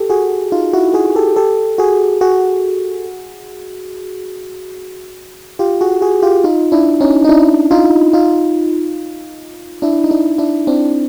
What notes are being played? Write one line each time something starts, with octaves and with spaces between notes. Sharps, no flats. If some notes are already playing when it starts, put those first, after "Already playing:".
Already playing: G4 A4
F#4 G#4
D#4 F4
E4 F#4
F#4 G#4
G4 A4
G4 A4
F#4 G#4
F#4 G#4
F4 G4
F#4 G#4
F#4 G#4
F4 G4
D#4 F4
D4 E4
C#4 D#4
D#4
D4 E4
D#4 F4
D#4 F4
D4 E4
D#4
D4 E4
D4 E4
C4 D4